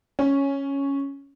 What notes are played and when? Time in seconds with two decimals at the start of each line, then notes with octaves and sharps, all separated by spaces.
0.19 C#4